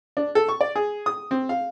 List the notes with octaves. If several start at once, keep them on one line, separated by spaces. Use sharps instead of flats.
D4
A4
C#6
D5
G#4
D#6
C4
F5